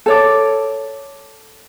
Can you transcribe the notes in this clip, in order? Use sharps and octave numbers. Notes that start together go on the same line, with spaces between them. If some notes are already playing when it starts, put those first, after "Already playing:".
A4 C#5 D5